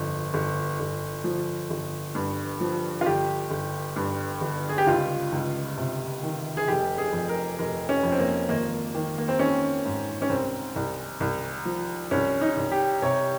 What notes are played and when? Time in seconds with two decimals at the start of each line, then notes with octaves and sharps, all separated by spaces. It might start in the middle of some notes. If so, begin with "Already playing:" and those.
Already playing: G1 F2
0.34 G1
0.80 G1
1.24 F3
1.70 G1
2.15 G2
2.60 F3
3.01 F4
3.06 G1 G4
3.51 G1
3.96 G2
4.41 G1
4.69 G#4
4.78 G4
4.87 C#2 F4
5.32 C#2
5.77 C3
6.23 D#3
6.57 G#4
6.68 F1 G4
6.98 G#4
7.13 F2
7.29 A#4
7.59 F1 A#4
7.89 C#4
8.03 F2
8.12 C4
8.19 A#3
8.49 G#1 A#3
8.95 D#3
9.18 A#3
9.28 C4
9.39 D#3 C#4
9.85 G#2
10.22 C#4
10.30 C2 C4
10.76 C2
11.20 C2
11.65 F3
12.11 C2 C#4
12.41 D#4
12.57 C2
12.72 G4
13.02 C3 C#5